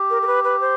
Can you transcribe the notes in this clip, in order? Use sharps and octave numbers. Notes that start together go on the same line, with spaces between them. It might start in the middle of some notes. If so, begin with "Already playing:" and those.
Already playing: G4
A#4
A#4
B4
B4
C5